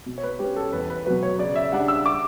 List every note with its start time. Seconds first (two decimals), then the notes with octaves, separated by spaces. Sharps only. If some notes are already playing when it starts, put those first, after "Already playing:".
0.06 B2
0.18 C#5
0.23 B4
0.39 G3 C#4 G4
0.56 A4
0.73 E2 B4
0.90 B4
1.06 B2 F#3 B4
1.23 C#5
1.39 C#3 D5
1.56 E5
1.72 G3 D4 F#5
1.88 E6
2.06 D6